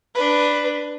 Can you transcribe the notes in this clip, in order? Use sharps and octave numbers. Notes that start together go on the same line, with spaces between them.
D4 B4